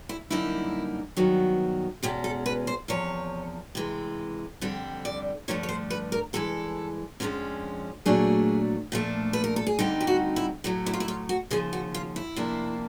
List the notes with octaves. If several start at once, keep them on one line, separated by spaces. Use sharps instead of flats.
E4
F#2 D3 G3 A#3 D#4 E4
G2 D#3 F#3 B3
E2 B2 G#3 C#4 G4
A4
B4
C5
E2 C3 F3 C#5
C3 E3 G#3
F2 D3 G3 C4
D5
G2 D3 F3 A3 D4 C#5
C#5
C5
B4
A#4
G2 E3 G#3 A4
F2 D3 F3 G#3 C#4
A#2 F#3 A3 D4 G#4
A#2 F3 A3 D4
B4
A#4
A4
G#4
D2 D3 G3 C4 D#4 G4
G4
F#4
E4
A2 F#3 A3 E4
E4
F4
E4
F4
F#4
D#2 C#3 F3 G#4
F#4
F4
E4
C3 F3 A#3 D4